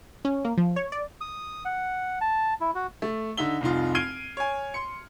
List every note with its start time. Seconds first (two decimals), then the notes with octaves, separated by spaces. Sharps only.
0.25 C#4
0.45 A#3
0.57 F3
0.76 C#5
0.92 D5
1.21 D#6
1.65 F#5
2.21 A5
2.61 E4
2.75 F#4
3.02 A3
3.37 D3 D#4 E5 G7
3.61 F1 C2 D#4 F4
3.95 F6 G#6 C7 D7 D#7 G7
4.37 C#5 G#5
4.74 C6 C#7